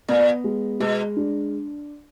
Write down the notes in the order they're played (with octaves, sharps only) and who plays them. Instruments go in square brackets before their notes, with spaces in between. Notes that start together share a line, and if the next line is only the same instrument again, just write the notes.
[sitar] A#2 [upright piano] B3
[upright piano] G#3
[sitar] B2 [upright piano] G#3
[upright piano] D4